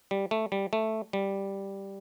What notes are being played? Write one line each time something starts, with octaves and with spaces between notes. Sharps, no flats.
G3
A3
G3
A3
G3